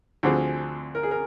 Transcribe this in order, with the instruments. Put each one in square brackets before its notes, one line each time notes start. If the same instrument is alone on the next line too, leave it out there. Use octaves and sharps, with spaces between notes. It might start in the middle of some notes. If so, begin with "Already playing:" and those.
[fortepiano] D2 D3 F3 C4 [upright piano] G#4
[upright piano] A#4
G#4
A#4